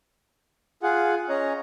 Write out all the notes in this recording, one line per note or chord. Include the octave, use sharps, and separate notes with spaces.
F4 G#4 F#5
C#4 C#5 D#5 A#5